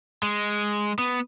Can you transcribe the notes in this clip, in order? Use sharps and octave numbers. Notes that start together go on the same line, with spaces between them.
G#3
B3